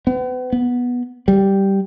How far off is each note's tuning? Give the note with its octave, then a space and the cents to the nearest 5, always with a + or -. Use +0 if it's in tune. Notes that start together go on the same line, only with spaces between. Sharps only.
B3 +40
B3 -10
G3 -5